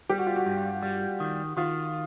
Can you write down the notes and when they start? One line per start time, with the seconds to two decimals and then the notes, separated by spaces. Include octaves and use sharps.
0.09 G3 G4
0.18 F#4
0.27 F4
0.36 F#4
0.46 G2
0.83 G3
1.20 D#3
1.57 D#3 F4